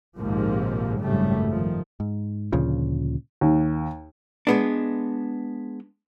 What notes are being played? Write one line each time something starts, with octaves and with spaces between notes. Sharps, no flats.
A#1 D#2 G#2 C3 F3 A#3
G#1 F#2 A2 C#3 G3 A3
D#3 F3
G#2
D2 A#2 C#3 F3
D#2
G#3 B3 D4